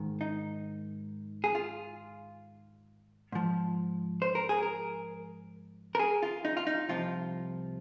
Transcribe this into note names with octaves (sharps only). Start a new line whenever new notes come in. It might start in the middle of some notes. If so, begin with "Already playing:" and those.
Already playing: G#2 D#3
D#4
G#4
F4
G#2 F3
C5
A#4
G#4
A#4
A#4
G#4
F4
D#4
F4
D#4
C2 C3 F3 F4